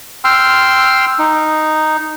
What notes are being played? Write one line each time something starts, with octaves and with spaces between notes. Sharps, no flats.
G5 C6 E6 F6
D#4